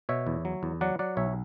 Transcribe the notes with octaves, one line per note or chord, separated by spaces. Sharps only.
B2 C#5 E5
E2
F#3
E2
F#3 D5 F#5
F#3 D5 F#5
B1 C#5 E5